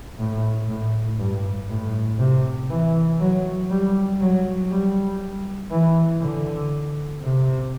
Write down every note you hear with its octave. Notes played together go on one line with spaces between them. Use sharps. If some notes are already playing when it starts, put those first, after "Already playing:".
A2
A2
G2
A2
C3
E3
F#3
G3
F#3
G3
E3
D3
C3